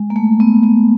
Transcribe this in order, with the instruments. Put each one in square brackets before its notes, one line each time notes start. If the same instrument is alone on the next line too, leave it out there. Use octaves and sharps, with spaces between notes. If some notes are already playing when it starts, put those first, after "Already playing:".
Already playing: [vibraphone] G#3
A#3
A3
B3
B3